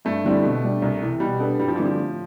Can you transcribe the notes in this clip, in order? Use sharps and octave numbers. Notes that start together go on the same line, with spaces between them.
G2 A3
D3 G3 C4 E4
B2
G3 D4
C2
C3 E3
B2 G3
B3 D4 A4 D5
G2 G3
F3
D3 E3 G3 C4 G4
F3
A2